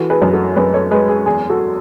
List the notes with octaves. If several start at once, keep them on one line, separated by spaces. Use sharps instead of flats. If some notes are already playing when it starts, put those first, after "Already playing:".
Already playing: E3 F#4 A4
G#4 B4
F#2
F#4 A4
F#2 G#4 B4
A4 C#5
G#3 G#4 B4
G#4
E2 G#4
F#4 A4